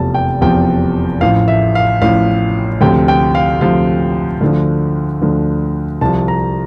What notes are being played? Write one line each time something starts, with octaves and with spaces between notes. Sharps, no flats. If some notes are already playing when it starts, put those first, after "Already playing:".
Already playing: F1 E2 C3 F3 A5
G5
F1 E2 C3 F3 G5
A1 A2 F3 F5
E5
F5
A1 A2 F3 F5
D2 C3 F3 G5
G5
F5
D2 C3 F3 F5
D2 D3 F3
D2 D3 F3
C2 C3 F3 A5
A#5